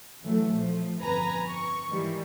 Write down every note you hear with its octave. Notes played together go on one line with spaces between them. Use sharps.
E3 F#3 A3
A#1 F3
G1 F2 B4 G#5 A#5
C#6
G#2 D#3 E3 G3